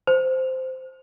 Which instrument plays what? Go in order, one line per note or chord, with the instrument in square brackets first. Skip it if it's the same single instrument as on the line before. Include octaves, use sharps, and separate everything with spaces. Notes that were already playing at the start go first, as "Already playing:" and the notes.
[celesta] C5